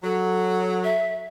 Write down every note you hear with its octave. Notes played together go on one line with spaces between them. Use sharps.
F#3 A4
E5